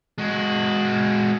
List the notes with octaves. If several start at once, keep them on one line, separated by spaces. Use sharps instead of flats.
G#3 F#4